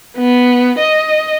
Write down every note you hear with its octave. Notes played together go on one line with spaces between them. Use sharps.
B3
D#5